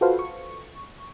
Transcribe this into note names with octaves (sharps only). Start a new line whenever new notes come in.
F4 F#4 A4 B4 C5 F5
C#6